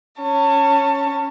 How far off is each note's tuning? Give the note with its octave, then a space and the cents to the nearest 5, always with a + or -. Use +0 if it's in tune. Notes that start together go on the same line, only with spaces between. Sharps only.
C#4 +0 A5 +30